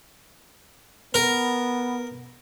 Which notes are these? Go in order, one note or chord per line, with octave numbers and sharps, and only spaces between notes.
B3 A#4